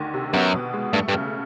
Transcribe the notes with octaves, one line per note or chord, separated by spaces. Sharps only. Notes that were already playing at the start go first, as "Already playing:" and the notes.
Already playing: D2 D#3
C3
F#2 B3
B2
G#3
G2 A3
G2
C#3